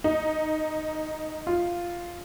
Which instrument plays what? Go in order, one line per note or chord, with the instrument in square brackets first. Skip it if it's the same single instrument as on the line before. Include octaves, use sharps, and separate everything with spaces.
[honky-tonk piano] D#4
F4